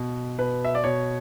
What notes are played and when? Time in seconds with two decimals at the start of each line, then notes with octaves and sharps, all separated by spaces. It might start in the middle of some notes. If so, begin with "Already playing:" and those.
Already playing: B2
0.39 B2 B4
0.65 E5
0.75 D5
0.84 B2 C#5